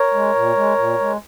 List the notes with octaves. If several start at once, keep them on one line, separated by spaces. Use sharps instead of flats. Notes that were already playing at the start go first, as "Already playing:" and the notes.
Already playing: A#4 C#5
G#3
A#2
G#3
A#2
G#3